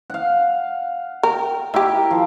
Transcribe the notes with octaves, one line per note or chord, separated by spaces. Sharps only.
F5 F#5
A#4 G5
D#3 E4 G4 A#4 G5
F3